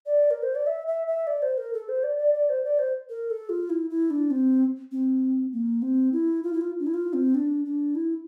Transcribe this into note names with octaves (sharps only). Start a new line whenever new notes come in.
D5
A#4
C5
D5
E5
E5
E5
D5
C5
A#4
A4
C5
D5
D5
D5
C5
D5
C5
A#4
A4
F4
E4
E4
D4
C4
C4
A#3
C4
E4
F4
E4
F4
D4
E4
F4
C4
D4
D4
E4